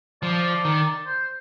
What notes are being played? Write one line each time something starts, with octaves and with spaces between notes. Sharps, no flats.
F3 D5
D#3
C5